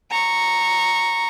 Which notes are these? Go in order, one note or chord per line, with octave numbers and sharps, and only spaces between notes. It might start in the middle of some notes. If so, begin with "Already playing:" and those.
A#5 C#6